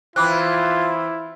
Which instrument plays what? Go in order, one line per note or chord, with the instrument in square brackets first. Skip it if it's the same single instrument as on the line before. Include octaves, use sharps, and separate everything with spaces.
[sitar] E3 C4 [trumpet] E4 [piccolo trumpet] F4 [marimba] B5 D6 F#6